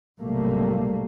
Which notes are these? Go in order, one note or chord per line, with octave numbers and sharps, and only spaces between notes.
B1 G#2 C3 G3 A3 A#3